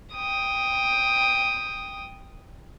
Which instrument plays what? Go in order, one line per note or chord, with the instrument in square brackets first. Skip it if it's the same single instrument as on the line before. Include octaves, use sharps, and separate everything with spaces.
[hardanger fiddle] G5 D#6